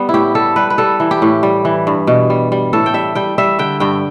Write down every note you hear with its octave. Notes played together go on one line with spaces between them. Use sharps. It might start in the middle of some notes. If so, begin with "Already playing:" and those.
Already playing: G3 B3
E4
A2 G4
G3 A4
G3 B4
B4
G3 A4
E3
G4
A2
G3
E3
G2
B2
G3
G3
A2 A4
G5
G3 E5
G3 G5
G3 E5
D3 G5
G2 G5